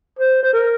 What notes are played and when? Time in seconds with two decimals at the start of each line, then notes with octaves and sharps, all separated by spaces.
0.19 C5
0.43 C5
0.53 A#4